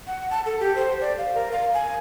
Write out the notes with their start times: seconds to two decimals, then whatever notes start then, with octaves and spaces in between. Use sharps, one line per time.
0.07 F#5
0.31 A5
0.46 A4
0.60 G4
0.76 C5
1.01 D5
1.18 F5
1.35 A#4
1.51 F5
1.74 G#5